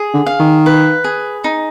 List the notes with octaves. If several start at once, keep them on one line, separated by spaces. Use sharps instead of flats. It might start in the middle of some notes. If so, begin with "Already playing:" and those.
Already playing: G#4
D3
F5
D#3
B4
G#4
D#4